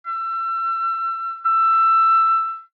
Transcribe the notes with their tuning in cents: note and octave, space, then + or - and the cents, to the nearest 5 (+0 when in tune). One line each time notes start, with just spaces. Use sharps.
E6 +30
E6 +15